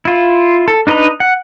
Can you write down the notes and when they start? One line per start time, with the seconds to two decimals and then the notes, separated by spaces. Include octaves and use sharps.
0.05 E4 F4
0.68 A4
0.87 D4 D#4 B4 D#5 A#5
1.20 F#5